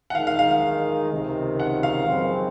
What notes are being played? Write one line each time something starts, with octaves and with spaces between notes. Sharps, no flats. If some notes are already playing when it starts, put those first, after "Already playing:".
F#5
D#3 G#3 D#4 F5
F5
F5
F5
C#2 C3 D#3
F#5
F5
F#2 C#3 F3 G#3 C4